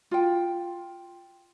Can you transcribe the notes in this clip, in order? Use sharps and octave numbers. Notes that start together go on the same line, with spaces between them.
F4 G5